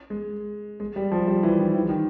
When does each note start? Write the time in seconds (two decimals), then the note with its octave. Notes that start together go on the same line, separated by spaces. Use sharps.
0.10 G#3
0.80 G#3
0.96 G3
1.12 F3
1.28 G3
1.43 E3
1.59 D#3
1.74 E3
1.89 D#3